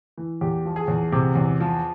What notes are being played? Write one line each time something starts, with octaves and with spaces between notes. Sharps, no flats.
E3
E2 G4
F3
G#4
E2
C3
E2
F3